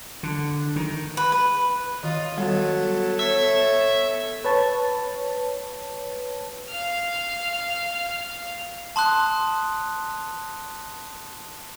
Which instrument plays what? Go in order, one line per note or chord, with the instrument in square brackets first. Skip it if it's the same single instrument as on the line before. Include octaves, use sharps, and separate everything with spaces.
[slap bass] D3
D#3
[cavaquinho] B4
B4
[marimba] D#3 [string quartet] F4 [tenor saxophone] D#5
[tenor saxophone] F#3 [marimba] G3 [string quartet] B3 A4
[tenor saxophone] C#5 [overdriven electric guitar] E5
[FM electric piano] B4 C#5 A5
[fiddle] F5 F6
[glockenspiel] A5 C6 D#6 F#6